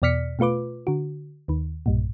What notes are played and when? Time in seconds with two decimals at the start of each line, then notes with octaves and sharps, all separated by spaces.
0.02 E2 B2 D5 F6 B6 C#7
0.39 B2 A3 F4 B4 D6
0.87 D3 F#4
1.48 D#2 D#3
1.86 B1 G2 A#2